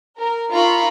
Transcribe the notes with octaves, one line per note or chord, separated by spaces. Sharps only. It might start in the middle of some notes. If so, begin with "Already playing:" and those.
A#4
D#4 F4 A#4 A#5 B5 C#6